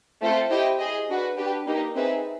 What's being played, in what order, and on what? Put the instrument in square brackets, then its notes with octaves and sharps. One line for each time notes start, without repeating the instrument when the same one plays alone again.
[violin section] A3 C4 F4 A4 C5
E4 G4 C5 D#5 G5
G#4 C5 D#5
D4 F#4 B4
D4 G4 B4
A#3 D#4 G4
C4 D#4 G#4 B4 E5